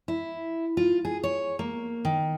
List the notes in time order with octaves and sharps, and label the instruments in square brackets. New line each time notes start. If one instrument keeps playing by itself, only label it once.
[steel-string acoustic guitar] E4
F4
G#4
C#5
A#3
D#3